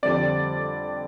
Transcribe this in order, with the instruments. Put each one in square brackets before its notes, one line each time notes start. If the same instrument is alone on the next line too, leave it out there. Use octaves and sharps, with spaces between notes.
[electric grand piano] F2 D3 G3 C4 D5